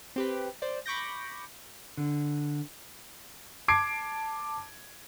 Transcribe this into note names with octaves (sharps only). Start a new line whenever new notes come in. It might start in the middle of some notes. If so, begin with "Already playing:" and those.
C4 G4 B4
C5 D5
B5 C#6 D6 G6 A#6
D3
A5 D6 G#6 C7 D7